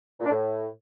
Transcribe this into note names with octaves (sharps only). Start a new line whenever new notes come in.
A#2
D4
A2